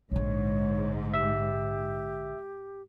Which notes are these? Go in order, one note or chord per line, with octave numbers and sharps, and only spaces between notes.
A#1 G#2 D3 C#5
G4 E5 E6